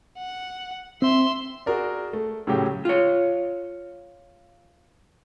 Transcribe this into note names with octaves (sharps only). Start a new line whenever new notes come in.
F#5
C4 E5 C6
F#4 G#4 A#4 D5
A3
A2 C#3 F#3 G4
F4 C#5